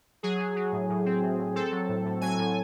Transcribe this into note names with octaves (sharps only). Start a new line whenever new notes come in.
F#3 G#4
F#3
F#3
A2
A2
C4
A2
A2
C4 A4
F#3
A2
A2
F#3 G#5
A2